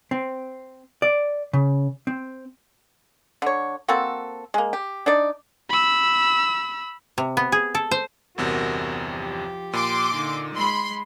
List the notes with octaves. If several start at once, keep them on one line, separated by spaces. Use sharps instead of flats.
C4
D5
C#3
C4
D3 C#5
A#3 C4 F#4 A4
G#3 A#3
G4
D4 D#4 D5
B5 E6
C3
B3
G#4
A4
C5
G1 E2 C3 F#4 A#4
F3 G4
A#2 C6 D6
D3 D#4
G#3 B5 C6